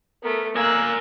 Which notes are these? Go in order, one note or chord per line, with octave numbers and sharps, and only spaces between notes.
A3 B3 A#4
A#3 A#4 G#5 E6 F#6